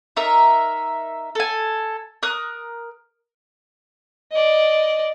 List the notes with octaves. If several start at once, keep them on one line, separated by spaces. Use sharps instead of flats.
D#4 A#4 E5
A4 G#5
A#4 D#6 F#6
D5 D#5